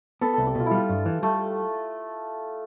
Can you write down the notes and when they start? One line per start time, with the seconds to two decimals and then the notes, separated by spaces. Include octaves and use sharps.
0.21 B3 A4
0.33 C2 A4
0.47 G4
0.55 B2 F4
0.66 E4
0.71 G3 F4
0.89 G2
1.06 E3
1.23 G3 A3